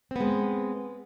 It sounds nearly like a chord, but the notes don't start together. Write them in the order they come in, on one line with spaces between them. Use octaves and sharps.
C4 B3 G#3